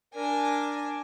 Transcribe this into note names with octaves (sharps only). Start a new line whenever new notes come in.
D4 A#4 G#5